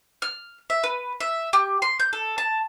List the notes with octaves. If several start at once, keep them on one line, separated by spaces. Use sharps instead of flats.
F6
E5
B4
E5
G4
C6
G6
A4
A5